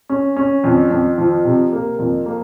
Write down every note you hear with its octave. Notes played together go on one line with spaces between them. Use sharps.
C#4
C#4
F2
F2
F3
C3
A#3
F2
A#3